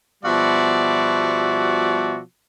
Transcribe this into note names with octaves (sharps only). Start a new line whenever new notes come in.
B2 F3 G3 F#4 D5 E5